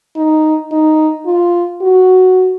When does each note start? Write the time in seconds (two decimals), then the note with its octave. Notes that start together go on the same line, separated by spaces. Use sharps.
0.16 D#4
0.72 D#4
1.26 F4
1.81 F#4